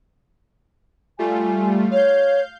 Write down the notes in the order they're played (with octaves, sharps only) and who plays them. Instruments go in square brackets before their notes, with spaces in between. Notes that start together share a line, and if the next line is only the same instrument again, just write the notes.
[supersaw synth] G3 A3 F4 [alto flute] G#5
[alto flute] C#5 [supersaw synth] F5 G6